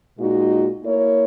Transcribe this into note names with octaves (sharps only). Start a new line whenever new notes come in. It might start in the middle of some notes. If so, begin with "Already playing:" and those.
A#2 G#3 D#4 F#4
A#3 E4 A#4 C#5